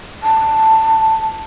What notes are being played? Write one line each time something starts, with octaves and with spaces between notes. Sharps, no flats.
A5